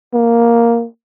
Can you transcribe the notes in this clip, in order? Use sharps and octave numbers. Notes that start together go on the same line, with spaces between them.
A#3